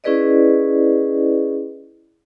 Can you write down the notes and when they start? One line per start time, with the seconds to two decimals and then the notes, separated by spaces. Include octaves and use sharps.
0.04 C#4 E4 G#4 B4 D5 D#5